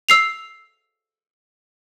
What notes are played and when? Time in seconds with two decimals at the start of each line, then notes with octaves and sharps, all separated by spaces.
0.09 E6 C7 F7